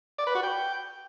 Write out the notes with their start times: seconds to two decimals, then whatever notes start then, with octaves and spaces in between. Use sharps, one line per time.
0.18 D5
0.27 B4
0.35 F#4
0.43 G5